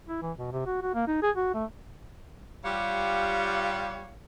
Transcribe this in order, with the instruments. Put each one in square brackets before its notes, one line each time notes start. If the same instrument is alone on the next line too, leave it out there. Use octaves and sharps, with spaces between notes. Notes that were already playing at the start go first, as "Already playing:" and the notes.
[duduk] E4
E3
B2
C3
F#4
F#4
A#3
D#4
G#4
F#4
A3
[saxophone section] G3 F4 G4 C#5 F5 F#5